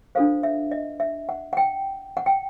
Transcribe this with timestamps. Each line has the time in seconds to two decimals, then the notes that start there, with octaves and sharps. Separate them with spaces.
0.15 D4 F4 A4 C5 F5
0.43 E5
0.72 D#5
1.00 E5
1.29 F#5
1.53 F#5
1.57 G5
2.17 F#5
2.26 G5